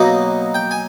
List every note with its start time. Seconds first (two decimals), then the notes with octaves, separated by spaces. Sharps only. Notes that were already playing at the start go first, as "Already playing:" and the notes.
Already playing: B2 F#3 A#3 D#4 F#5
0.54 G5
0.71 G#5